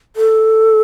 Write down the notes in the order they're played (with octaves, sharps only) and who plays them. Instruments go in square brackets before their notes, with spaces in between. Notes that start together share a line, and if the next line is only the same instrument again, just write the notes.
[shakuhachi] A4